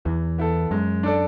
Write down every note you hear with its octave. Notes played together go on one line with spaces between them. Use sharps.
E2 E3
B3 E4 A4
F#2 G#3
D4 A4 D5